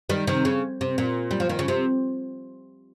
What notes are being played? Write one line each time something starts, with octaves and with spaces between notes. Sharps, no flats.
D#3 G3
C3 D#3
C#3
C3
A#2
G3
F3
D#3
C#3
C3